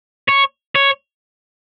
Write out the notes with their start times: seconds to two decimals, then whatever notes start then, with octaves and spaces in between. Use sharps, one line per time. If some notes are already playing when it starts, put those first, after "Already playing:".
0.29 C#5
0.76 C#5